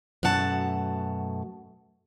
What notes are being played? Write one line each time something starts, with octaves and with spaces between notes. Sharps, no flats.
F#2 B2 A3 F#5 A5